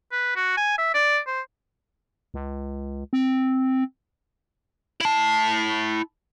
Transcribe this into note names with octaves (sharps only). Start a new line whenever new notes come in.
B4
F#4
G#5
E5
D5
C5
C#2
C4
E4 A5